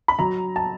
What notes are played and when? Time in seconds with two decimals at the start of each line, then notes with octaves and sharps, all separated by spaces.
0.08 B5
0.19 F#3 A#5
0.56 A5